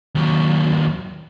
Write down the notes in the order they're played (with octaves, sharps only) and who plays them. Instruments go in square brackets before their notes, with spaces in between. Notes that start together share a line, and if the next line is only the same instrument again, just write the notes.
[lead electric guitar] D#2 F#3